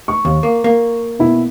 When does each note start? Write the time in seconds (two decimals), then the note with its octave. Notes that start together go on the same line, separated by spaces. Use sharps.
0.08 C#6
0.25 D#2
0.43 A#3
0.64 A#3
1.19 B2 E4